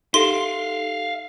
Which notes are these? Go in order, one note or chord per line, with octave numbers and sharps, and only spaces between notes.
D#4 G4 A4 E5 F5 C6